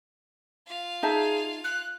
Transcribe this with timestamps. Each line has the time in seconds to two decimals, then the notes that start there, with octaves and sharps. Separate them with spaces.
0.67 F4 F5
1.03 D#4 G#4 E5 A5
1.64 F#6